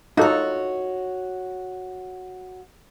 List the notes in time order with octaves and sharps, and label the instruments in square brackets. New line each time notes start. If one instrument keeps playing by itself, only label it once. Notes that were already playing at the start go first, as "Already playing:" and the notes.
[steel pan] D#4 F4 A4 [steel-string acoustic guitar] F#4 C#5